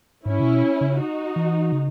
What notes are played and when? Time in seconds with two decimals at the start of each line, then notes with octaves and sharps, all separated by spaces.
0.25 G#2 C#4 E4
0.40 C#3
0.43 B2
0.81 C#3
0.98 D#4 F#4
1.36 E3
1.72 C#3